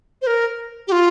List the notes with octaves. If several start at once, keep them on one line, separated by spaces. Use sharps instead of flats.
C5
A#4
G4
F4